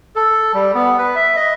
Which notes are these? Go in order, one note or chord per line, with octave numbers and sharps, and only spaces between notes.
A4
G3
B3
B4
E5
D#5